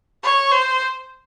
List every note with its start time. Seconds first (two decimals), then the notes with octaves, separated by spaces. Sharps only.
0.23 C#5
0.51 C5